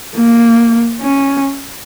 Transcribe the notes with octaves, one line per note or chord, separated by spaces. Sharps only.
A#3
C#4